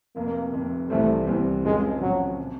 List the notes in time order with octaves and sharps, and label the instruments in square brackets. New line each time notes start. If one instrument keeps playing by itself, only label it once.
[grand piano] F1 F2 C3 [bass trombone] A#3
[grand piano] F1 F2 C3
[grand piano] C2 C3 E3 G3 C4 [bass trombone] A3
[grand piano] C2 C3 E3 G3 C4
[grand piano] F1 F2 C#3 F3 [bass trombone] G#3
[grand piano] F1 F2 C#3 F3 [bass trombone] F#3
[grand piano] C3